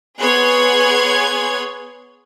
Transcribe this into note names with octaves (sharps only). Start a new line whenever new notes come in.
B3 G#4 C#5 C6 F#6 G#6